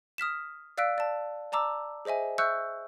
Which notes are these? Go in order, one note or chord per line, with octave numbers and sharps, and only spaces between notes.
D#6 F6 B6 E7
D5 F5 E6 F#6 B6 D7
D5 A5
D5 A5 A#5 D6 E6
G#4 C5 D#5 E5 G#5
E5 C#6 E6 F#6 G6 C#7